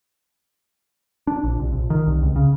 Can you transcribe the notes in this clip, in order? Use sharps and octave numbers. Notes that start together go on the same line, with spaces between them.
D4
A#1
C2
A#1
D#3
C2
C#2
C#3